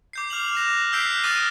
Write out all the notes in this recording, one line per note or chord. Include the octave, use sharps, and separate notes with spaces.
D6 G6 C7
D6 F6 F7 F#7
F#6 A#6 E7
E6 F#6 G6 B6 C7 D7
D6 D#6 F6 A6 D#7 G7